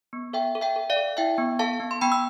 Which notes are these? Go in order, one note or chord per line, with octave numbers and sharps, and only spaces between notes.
B3
A4 E5 G5
A4
E5 G5
A4
D5 F5
A4
E4 E5 G5
B3
A4 F5 A5
B3
C6
B3 G5 B5
E6